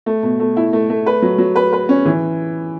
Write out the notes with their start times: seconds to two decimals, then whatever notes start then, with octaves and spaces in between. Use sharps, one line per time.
0.06 A3
0.23 B2
0.40 A3
0.57 E4
0.73 A3
0.90 A3
1.06 B4
1.22 F#3
1.38 F#3
1.56 B4
1.73 B4
1.89 C#4
2.05 E3